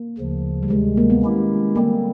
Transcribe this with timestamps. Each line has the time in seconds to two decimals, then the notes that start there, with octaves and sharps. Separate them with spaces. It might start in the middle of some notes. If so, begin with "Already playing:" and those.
Already playing: A#3
0.18 D2 C#3 F3
0.63 G3
0.70 D2 C3 D#3 G#3
0.97 A#3
1.10 B3
1.23 D#3 G#3 C#4 E4 G4
1.76 D3 G3 A#3 C4